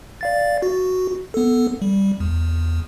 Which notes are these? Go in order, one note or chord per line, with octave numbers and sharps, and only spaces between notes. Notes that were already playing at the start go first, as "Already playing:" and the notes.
D5 F5 A6
F#4
B3 A4
G3
E2